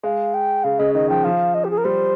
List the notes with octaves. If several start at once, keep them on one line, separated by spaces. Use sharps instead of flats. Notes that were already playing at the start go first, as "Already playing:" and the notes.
G#3 F5
G5
C#3 F5
C#3 D#5
D#3 D#5
F3 G5
F3 F5
D#5
G4
G#4
A#4
G3 C5